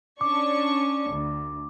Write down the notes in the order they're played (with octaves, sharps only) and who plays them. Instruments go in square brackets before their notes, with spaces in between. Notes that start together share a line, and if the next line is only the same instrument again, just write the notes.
[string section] C#4 D4 C#6 [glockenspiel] D6
[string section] D2